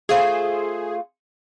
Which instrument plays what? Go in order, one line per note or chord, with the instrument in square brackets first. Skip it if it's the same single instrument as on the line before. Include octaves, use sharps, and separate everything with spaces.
[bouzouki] A3 F4 C5 [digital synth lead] G#4